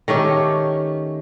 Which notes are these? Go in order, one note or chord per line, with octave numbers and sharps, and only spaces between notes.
D#3 A3 C#4 G4